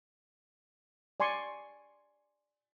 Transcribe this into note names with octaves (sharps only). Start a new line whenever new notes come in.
D5 G#5 C6 C#6